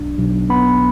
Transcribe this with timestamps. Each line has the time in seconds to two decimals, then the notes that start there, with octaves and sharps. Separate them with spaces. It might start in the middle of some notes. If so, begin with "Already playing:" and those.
Already playing: B1 D4
0.19 B1
0.50 B3 B5